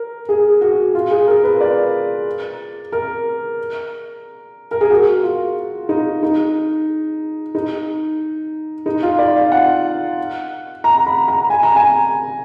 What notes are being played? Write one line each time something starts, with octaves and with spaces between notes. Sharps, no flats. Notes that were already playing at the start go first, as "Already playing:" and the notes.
Already playing: A#4
G#4
F#4
F4
G#4
A#4
B4
D5
A#4
A#4
G#4
F#4
F4
D#4
D#4
D#4
D#4
F4
D5
F5
F#5
A#5
B5
A#5
G#5
A#5
G#5